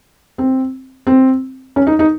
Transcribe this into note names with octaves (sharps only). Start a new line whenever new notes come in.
C4
C4
C#4
D#4
D#4